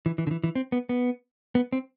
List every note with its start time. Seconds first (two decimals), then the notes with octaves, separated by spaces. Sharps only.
0.06 E3
0.18 E3
0.27 D3
0.31 E3
0.44 E3
0.55 C4
0.72 B3
0.89 B3
1.55 B3
1.72 C4